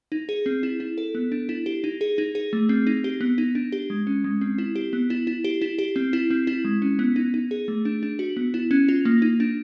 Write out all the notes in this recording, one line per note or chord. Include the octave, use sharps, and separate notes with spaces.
D#4
G#4
C4
E4
E4
A4
B3
D4
E4
G4
D#4
G#4
D#4
G#4
A3
C4
D#4
G4
B3
D#4
D4
G4
G#3
C#4
G#3
C4
E4
G4
B3
E4
E4
G4
E4
G4
C4
E4
C4
E4
G#3
C#4
B3
D#4
D#4
G#4
A3
D4
D4
F#4
B3
E4
C#4
F4
A#3
D#4
D4